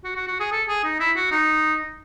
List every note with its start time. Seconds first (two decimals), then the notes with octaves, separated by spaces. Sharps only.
0.04 F#4
0.16 F#4
0.28 F#4
0.40 G#4
0.52 A4
0.68 G#4
0.84 D#4
1.00 E4
1.16 F#4
1.31 D#4